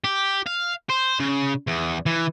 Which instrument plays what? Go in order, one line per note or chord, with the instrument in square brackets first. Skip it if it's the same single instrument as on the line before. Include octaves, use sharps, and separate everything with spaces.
[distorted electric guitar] G4
F5
C5
C#3
E2
E3